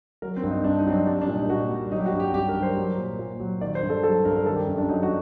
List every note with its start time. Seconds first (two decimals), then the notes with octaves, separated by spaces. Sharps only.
0.22 F#3 A#4
0.37 C4
0.43 G2
0.50 D#4
0.64 G2 D4
0.79 D#4
0.86 F#3 C4
0.93 D4
1.07 G3 D4
1.21 D4
1.28 A#2
1.35 D#4
1.49 A#2 F#4
1.70 G3
1.92 F#3 D#4
2.00 G4
2.06 F#4
2.13 G2
2.20 G4
2.34 G2 G4
2.49 A#4
2.56 F#3
2.63 C5
2.77 F#3
2.97 A#2
3.19 A#2
3.40 F#3
3.61 D#3 D5
3.75 C5
3.83 G2
3.90 A4
4.03 F#3 A4
4.25 G2 A#4
4.36 A#4
4.46 D#3 A4
4.56 G4
4.67 F#2
4.78 D4
4.89 F#3 D#4
5.03 F#4